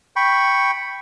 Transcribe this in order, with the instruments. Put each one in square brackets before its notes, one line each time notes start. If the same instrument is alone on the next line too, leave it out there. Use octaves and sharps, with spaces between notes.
[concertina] G5 B5 C#6